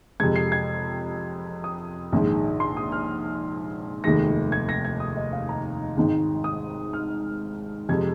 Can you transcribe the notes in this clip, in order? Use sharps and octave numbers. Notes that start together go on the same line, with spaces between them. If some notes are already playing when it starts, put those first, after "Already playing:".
F2 C3 G#3 G#6
C7
G#6
D#6
A#1 G#2 D#3 G#3
C6
D#6
F6
F1 D#2 D#3 G#3 A#6
G#6
A#6
G#6
D#6
D#5
F5
A#5
G#1 G#2 D#3 G#3
D#6
F6
F2 C3 G#3 G#6